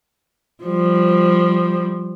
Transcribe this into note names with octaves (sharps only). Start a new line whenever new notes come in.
F3 G3